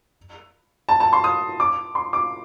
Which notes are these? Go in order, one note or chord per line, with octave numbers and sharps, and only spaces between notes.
A5
A5
C6
D#6
D6
C6
D6